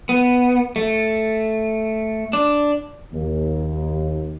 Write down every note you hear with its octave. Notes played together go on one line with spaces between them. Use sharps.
B3
A3
D4
D#2